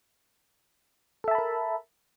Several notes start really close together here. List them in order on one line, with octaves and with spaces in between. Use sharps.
A4 E5 A5 B5 A#4